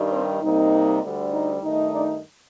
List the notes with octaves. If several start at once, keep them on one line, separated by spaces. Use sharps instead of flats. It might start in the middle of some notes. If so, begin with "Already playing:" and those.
Already playing: G2 D#3 G3 D#4
C4 C5
C3 G3 A#3 D#4
D2 D3 G3
D#4 D#5
G2 D#3 A3 D#4
D4 D5